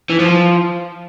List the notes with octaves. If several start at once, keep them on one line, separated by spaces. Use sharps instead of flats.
E3
F3